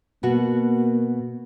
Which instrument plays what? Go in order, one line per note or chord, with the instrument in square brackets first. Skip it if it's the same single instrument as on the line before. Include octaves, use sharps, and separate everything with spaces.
[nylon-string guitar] B2 F#4 [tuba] A#3